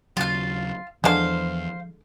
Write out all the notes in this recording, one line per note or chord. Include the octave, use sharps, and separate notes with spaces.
D#2 C#3 F#3 F4 F5
E2 D3 F3 G#3 C5 F5